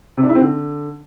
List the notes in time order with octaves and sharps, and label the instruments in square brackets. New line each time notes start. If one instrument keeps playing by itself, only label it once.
[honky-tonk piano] C3
D4
E4
C4
D3